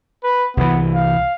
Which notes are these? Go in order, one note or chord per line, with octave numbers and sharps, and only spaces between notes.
B4
C2 E3 B3
F5